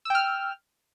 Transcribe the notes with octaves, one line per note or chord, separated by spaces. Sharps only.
G5 E6 F6